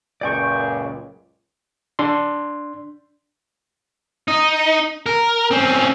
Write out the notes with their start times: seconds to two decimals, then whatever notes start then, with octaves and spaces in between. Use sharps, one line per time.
0.21 C#2 F#2 A#2 D5 G5 C#6
1.99 D4 C6
4.28 D#4
5.06 A#4
5.51 C4 C#4